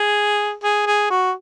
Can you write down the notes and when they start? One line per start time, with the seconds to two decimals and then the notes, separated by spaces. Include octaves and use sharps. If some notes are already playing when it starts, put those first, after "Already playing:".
Already playing: G#4
0.63 G#4
0.86 G#4
1.10 F#4